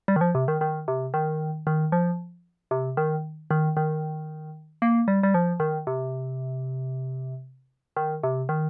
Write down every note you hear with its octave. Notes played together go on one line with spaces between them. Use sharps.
G3
D#3
F3
C3
D#3
D#3
C3
D#3
D#3
F3
C3
D#3
D#3
D#3
A#3
G3
G3
F3
D#3
C3
D#3
C3
D#3